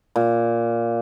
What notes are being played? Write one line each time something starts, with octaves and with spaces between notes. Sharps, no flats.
A#2